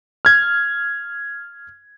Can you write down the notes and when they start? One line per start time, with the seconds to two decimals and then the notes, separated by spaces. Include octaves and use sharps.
0.25 F6 G#6